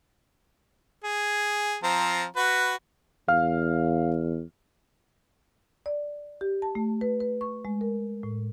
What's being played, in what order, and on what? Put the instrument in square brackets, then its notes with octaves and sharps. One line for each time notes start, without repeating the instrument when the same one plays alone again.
[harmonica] G#4
F3 C4 A#5
F#4 B4
[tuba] E2 [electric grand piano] F5 F6
[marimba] D5
G4
A5
A3
B4
B4
C#6
G#3
A#4
A2